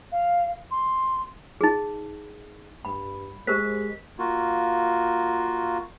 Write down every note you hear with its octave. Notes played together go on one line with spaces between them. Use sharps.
F5
C6
D#4 G#4
G2 B5
G#3 G4 A#4 C5 B6
A#3 F4 F#4